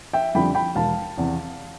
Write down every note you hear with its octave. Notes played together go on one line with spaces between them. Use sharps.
E5 G5
F2 D3 G3 G5 B5
G5 B5
E1 F5 A5
E2 C3